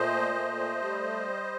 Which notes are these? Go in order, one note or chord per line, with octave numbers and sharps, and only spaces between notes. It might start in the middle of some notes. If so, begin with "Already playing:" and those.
Already playing: A#2 A3 C5 D#5
A3
G3